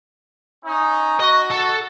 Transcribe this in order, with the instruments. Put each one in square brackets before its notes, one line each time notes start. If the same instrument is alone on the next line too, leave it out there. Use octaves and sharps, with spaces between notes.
[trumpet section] C#4 D#4
[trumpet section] F#4 [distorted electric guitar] D#5
[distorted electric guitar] A4 A5